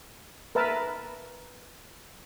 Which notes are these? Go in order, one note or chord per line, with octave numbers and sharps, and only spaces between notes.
A#4 B4 E5 A5